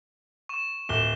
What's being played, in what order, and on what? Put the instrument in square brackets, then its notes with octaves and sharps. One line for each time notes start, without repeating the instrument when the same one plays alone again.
[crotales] C#6 E7
[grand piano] D1 [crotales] E7 G7